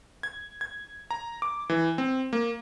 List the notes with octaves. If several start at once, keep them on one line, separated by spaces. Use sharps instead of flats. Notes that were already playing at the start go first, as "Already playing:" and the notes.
G#6
G#6
A#5
D6
E3
C4
A#3